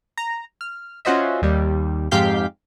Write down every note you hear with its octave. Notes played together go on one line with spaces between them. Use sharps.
A#5
F6
C#4 F4 F#4 C5 D#5 E5
D#2 G3
F2 G#2 G4 F5 G6 B6